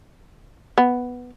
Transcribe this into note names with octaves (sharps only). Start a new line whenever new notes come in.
B3